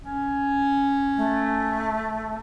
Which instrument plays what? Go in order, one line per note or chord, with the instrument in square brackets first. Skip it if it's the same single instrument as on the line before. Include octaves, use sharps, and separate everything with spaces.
[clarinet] C#4
[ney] A3